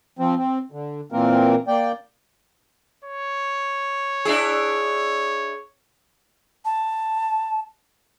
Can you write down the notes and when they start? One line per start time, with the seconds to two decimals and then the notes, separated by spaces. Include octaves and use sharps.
0.19 F3 C4
0.37 C4
0.72 D3
1.12 A#2 E3 A#3 C4 A#4
1.68 A#3 D5 G5
3.04 C#5
4.25 D4 E4 G#4
6.65 A5